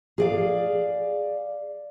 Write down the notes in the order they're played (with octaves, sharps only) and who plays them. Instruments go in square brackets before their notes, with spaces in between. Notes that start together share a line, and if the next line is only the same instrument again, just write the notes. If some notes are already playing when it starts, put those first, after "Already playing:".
[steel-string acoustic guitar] G#4 D5 F5